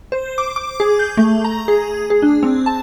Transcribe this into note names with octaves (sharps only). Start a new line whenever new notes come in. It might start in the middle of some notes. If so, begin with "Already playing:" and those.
C5
D6
D6
G#4
G6
A3
A#5
G#4
G#4
D4
C4
A5